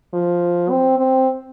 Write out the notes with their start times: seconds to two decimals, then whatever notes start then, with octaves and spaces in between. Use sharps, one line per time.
0.14 F3
0.70 C4
0.98 C4